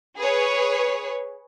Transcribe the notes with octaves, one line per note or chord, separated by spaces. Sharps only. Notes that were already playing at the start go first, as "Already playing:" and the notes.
G#4 B4 C#5